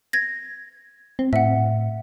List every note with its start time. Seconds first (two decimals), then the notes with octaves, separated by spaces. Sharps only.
0.13 G#6 A#6
1.19 C4
1.33 A2 E5 F#5